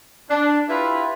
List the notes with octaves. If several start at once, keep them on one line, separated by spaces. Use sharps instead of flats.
D4
E4 F4 G4 B4